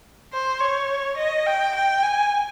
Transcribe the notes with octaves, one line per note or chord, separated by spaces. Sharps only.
C5
C#5
D#5
G5
G5
G#5